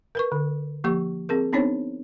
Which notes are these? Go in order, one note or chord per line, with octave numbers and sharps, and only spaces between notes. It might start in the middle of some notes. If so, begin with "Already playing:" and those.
A#4 B4 C#6
D3
F3 A#3 G4 C#6
C4 G#4 A#4
B3 C4 D4 D#4 C5 C#5